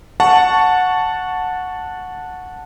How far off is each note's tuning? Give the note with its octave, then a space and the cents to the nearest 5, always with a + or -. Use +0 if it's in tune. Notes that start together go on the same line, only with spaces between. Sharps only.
F#5 -15 A5 +0 C#6 +0